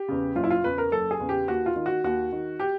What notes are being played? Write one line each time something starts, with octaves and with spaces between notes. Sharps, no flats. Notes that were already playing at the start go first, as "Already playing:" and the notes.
Already playing: G4
E2 C#3
F#1 F4
E4
F4
E2 C#3 B4
A#4
F#1 A4
G#4
E2 C#3
G4
D#2 F#4
F4
D#3
F#4
D#2 F#4
D#3
G4